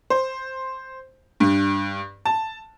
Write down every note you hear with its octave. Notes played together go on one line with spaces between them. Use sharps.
C5
G2
A5